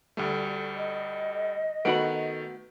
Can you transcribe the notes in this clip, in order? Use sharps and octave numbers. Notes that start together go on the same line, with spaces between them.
D2 G3 A3
D#5
D#3 A3 B3 F#4 B5 D7